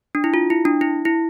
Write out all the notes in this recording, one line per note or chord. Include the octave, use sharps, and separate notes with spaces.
D4
E4
F4
E4
D4
E4
E4